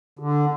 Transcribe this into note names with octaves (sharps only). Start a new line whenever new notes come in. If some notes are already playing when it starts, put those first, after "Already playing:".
D3